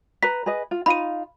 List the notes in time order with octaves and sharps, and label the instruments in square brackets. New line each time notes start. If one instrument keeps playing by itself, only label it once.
[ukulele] B4 A#5 [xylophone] B6
[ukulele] G#4 B4 D#5
F4
[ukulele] D#4 F4 F5 [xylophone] B5 D#7